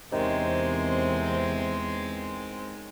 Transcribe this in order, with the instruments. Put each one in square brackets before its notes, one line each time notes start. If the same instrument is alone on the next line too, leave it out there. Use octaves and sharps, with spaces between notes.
[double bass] E2 [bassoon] C3 [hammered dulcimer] D#3 C#4 [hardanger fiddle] G#3 C4